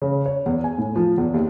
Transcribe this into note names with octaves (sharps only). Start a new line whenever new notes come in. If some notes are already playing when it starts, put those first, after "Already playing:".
C#3
C#5
E2
G#5
A2
F3
E2
D#2